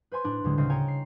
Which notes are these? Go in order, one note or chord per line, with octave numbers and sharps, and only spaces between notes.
B4 C5 G#5 C6
A2 D4
D2 A2 D3 G3 G#3
D2 C#3 C4 A4 D#5 C7
C#5 G5 G#5 A#5
C7